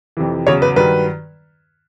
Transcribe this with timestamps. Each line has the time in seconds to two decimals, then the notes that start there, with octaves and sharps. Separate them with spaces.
0.17 F2 C3 E3
0.47 E2 C#3 F#3 C#5
0.62 B4
0.76 G2 D#3 F#3 B4